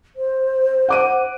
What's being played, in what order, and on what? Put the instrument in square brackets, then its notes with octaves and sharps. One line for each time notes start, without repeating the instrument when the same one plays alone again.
[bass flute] C5
[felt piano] F#5 D6 D#7